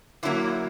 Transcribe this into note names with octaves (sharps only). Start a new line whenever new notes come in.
D3 F#3 A#3 E4